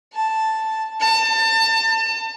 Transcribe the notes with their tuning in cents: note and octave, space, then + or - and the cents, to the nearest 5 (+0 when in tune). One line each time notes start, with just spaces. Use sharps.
A5 +0
A5 +30